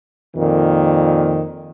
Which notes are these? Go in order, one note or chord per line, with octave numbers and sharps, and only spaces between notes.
F2 A#2 D#3